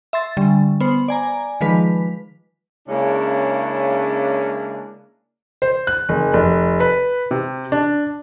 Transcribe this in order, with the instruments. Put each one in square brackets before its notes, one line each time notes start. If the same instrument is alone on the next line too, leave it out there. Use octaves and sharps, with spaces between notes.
[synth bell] E5 C6 A6
D3 G3
B3 C5
D5 G#5 A#5
D#3 F3 G#3 B4 B6
[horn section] C#3 G#3 A#3 C#4 D4 E4
[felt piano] C5
F#6
F#1
F1
B4
C3
D4